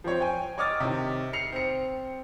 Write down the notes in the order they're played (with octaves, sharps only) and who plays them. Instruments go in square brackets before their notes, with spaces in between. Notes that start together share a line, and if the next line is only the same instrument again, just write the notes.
[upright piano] F3 C4 C5 C#5
G5 G#5
C#5 D#5 D6 D#6 F6 A6
C3 D#3
C7 C#7 F7
C4 C#7